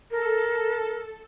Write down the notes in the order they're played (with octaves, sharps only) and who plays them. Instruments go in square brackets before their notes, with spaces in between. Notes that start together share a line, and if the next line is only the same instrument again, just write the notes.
[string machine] A4 [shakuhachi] A#4